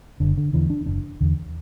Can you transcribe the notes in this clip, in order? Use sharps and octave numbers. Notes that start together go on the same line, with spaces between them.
F#1 D3
D3
E2 D3 E3
D4
F#1 D4
E2 D3